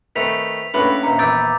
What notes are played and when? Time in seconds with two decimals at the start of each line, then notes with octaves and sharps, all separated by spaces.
0.16 D#3 A3 C4 B4 B6 F7
0.74 A2 A#3 C#4 D4 B4 F#5 C6
1.03 A#1 D#2 E5 A#5
1.19 E2 B4 D6 E6 G6 A6